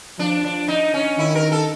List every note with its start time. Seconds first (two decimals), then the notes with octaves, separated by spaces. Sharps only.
0.19 F3 D4
0.44 D4
0.68 D#4
0.94 C#4
1.19 D#3 E4
1.35 A#4
1.52 A4